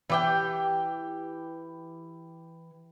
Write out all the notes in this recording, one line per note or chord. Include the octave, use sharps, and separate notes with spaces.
E3 G4 G5